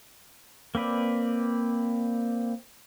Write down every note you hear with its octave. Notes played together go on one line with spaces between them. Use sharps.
A#3 C4 B4 D5